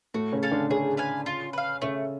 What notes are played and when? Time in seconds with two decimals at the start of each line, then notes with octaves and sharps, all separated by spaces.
0.14 A2 A3 F#4
0.32 C#3 C#4
0.43 A4 F5 G#5
0.51 D3 D4
0.69 C#3 C#4 G#4
0.97 B4 F5 G#5
1.26 F4
1.53 B4 F5
1.82 C#3 A3 C#4